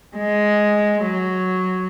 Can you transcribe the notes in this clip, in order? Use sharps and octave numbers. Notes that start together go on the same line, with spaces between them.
G#3
F#3